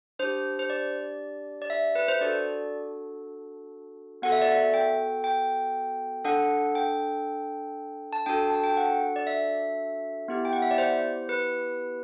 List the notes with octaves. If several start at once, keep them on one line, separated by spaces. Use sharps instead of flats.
D4 G4 C5
C5
D5
D5
E5
B4
C5
D4 F#4 A4 D5
B3 F#4 A4 F#5
E5
D5
E5
G5
G5
D4 A4 F#5
G5
A5
D4 F#4 A4 G5
A5
G5
F#5
D5
E5
B3 E4 G4
G5
F#5
E5
D5
C5
B4